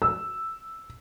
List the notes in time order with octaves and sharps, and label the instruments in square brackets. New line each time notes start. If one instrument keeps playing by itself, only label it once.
[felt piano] E6